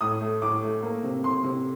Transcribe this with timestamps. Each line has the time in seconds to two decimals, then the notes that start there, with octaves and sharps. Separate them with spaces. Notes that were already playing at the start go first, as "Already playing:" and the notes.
0.01 A2 D#6
0.21 A3
0.42 A2 D6
0.63 A3
0.83 A#3
1.04 C3
1.23 C3 C6
1.43 C3